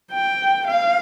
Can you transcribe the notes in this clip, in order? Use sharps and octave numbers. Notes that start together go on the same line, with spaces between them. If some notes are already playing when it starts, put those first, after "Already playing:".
G5
F5